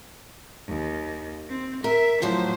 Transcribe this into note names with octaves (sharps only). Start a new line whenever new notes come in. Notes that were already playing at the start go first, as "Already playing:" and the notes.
D#2
C4
A#4 E5
A2 F3 F#3 C5